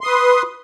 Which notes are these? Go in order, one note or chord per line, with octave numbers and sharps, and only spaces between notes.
B4 C6 D#6